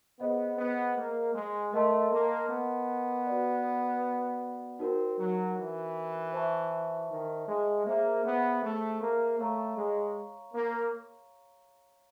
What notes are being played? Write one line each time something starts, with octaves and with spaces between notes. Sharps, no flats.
B3 G#4 C5 D#5 F#5
B3
A#3
G#3
A3 A#4 D#5 F#5 A5 C6
A#3
B3
F#4 B4 D5
C4 D#4 F#4 A#4
F#3
E3
C5 E5 A5 C#6
D#3
G#3
A#3 G#4 C5 E5
B3
A3
A#3
A3 C#5 F5 A#5 C#6
G#3
A#3